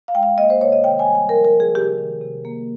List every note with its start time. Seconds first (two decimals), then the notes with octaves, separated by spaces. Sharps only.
0.08 F5
0.15 G#3 G5
0.23 F5
0.37 A#3 D#5
0.50 C5
0.61 C3 C#5
0.72 D#5
0.84 D#3 G5
0.99 G#5
1.06 G3
1.15 G5
1.29 F3 A#4
1.44 A#4
1.53 F3
1.60 G#4
1.75 C3 G4
1.98 D#3
2.21 C3
2.45 A#3